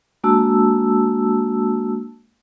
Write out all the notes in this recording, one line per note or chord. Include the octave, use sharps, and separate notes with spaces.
G#3 A#3 D4 F#4 A5 E6